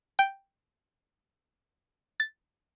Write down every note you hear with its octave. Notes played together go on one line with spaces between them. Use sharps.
G5
A6